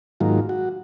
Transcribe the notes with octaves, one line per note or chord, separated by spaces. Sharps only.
G#2 D#3 F#3 A#3 F4
F#4